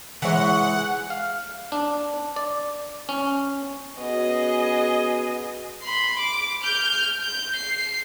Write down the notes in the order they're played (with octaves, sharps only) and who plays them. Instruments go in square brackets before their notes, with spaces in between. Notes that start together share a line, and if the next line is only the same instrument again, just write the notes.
[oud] E3 G#3 C#5 [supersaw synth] F#5
[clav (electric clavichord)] F5
D4
D5
C#4
[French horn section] B3 C#4 F#4 [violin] G#4 D#5
[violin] B5 C6
D6
F6 G6
G6
C7